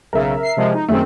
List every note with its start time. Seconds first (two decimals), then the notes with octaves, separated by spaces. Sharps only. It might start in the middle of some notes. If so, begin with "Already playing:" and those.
0.13 B1 C#3 A#4 E5
0.43 C7
0.57 C3 F3 G#3
0.74 D#4
0.88 F#2 D#3 A3 C4 G#4